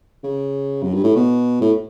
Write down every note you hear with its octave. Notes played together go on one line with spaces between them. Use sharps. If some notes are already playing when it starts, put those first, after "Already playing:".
C#3
F#2
G2
A2
B2
A2